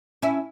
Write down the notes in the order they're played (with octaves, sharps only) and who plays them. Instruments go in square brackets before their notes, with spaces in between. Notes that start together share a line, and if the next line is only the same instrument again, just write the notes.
[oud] C#4 E4